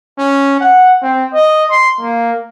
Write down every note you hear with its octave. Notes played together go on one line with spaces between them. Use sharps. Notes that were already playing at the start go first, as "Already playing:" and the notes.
C#4
F#5
C4
D#5
C6
A#3